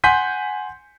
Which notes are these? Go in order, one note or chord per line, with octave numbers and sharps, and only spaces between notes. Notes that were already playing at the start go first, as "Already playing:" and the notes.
F#5 G#5 C6 G6 B6 D#7